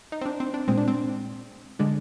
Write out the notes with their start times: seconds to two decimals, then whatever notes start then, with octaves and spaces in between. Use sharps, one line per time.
0.12 D#4
0.21 C4
0.26 D4
0.40 C4
0.54 D4
0.68 A#2 G#3 C4
0.78 D4
0.88 C4
1.79 D3 G#3 D4